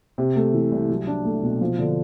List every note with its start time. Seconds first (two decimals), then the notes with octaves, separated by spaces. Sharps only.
0.18 C3
0.36 A3
0.54 E3
0.72 C2
0.89 F#3
1.07 D4
1.25 A3
1.43 B2
1.61 F3
1.79 D3